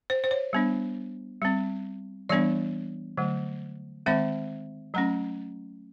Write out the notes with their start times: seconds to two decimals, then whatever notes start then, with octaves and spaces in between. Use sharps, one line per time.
0.10 C5
0.24 C5
0.31 C#5
0.53 G3 B3 D4
1.42 G3 C4
2.29 E3 G3 B3 D4 D5
3.17 D3 F#3 A3
4.06 D#3 G#3 C4 E5
4.94 F#3 A3 C#4 A#5